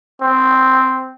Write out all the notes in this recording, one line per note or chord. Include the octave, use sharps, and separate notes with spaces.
C4